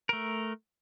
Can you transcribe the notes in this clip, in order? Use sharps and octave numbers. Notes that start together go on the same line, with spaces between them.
A3 A#4